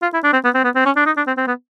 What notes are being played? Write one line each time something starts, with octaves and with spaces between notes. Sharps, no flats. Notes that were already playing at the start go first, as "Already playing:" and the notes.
F4
E4
D4
C4
B3
C4
B3
C4
C#4
D4
D#4
D4
C4
C4
B3